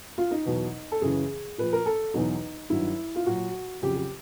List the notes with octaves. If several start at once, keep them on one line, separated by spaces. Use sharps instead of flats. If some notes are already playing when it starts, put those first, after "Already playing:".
F4
D#4
E2 B2 F#3
A4
F#2 C#3 E3 G#4
A#2 F3 B4
A#4
A4
E2 B2 F#3 D#4
G2 D#3 F#3 E4
F4
A#2 F#3 F#4
F2 C#3 F#3 G4
G4